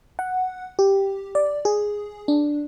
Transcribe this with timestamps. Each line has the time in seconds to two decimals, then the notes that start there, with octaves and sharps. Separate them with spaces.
0.19 F#5
0.79 G4
1.35 D5
1.65 G#4
2.28 D4